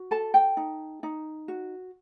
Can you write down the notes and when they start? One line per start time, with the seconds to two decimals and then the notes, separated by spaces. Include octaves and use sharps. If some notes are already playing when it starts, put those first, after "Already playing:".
Already playing: F#4
0.11 A4 A5
0.34 G5
0.57 D#4
1.03 D#4
1.48 F#4